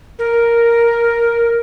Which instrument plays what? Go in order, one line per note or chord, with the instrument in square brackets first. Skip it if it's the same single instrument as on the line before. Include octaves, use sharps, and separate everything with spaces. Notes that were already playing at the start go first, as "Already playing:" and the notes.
[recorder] A#4